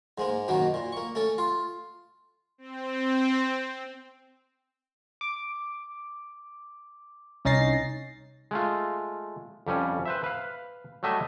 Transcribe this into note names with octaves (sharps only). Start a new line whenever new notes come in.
G#2 G#3 A#3
F#2 B2 D#3 F#3 A#3
A#2
A#3 C#6
A3 C#4 A4
F4
C4
D6
C2 C#4 D#4 A6 A#6 C7
G#3 A3 F4
F2 G3 C#4
B4 C5 E5
B4 F5
F#3 G3 A3 D#5 E5